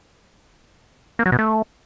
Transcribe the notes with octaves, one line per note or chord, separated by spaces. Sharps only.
A#3
F#3
B2
A3